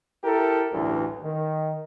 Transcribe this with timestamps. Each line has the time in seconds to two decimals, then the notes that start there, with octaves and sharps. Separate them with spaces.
0.24 E4 G4 A4 A#4
0.73 A1 D2 G2 E3
1.23 D#3